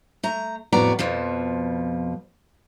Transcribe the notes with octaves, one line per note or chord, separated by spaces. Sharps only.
A3 A#5
F2 A2 B3 F#4 D5 A#5
F2 B2 F3